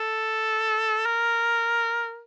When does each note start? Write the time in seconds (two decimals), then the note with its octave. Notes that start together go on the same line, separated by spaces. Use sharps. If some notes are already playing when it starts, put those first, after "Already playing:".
Already playing: A4
1.05 A#4